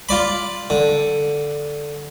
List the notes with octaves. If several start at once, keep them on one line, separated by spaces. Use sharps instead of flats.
F4 D5 B5
D3